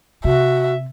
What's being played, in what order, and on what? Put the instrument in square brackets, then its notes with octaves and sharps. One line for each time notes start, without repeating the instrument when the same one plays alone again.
[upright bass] C3 [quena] F#4 [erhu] E5